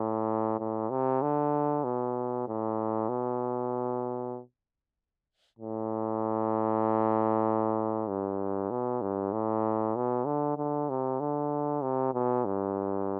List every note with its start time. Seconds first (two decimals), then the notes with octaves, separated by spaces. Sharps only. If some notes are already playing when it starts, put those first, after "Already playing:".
Already playing: A2
0.59 A2
0.90 C3
1.22 D3
1.84 B2
2.47 A2
3.09 B2
5.59 A2
8.08 G2
8.71 B2
9.02 G2
9.33 A2
9.96 B2
10.26 D3
10.57 D3
10.89 C3
11.20 D3
11.83 C3
12.14 B2
12.45 G2